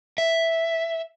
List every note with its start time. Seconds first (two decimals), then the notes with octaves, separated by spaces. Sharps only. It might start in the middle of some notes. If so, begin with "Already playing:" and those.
0.18 E5